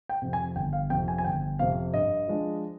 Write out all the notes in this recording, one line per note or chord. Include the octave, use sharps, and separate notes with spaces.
G5
F2 C3
G#5
G1 G5
F5
F2 C3 G5
G#5
G#5
G1 G5
F2 C3 F5
G2 D#5
F3 G#3 D4